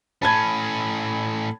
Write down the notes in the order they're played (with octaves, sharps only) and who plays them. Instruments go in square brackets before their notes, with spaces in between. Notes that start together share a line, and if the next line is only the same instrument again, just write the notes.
[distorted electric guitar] A2 C#4 [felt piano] A5 B5 G#6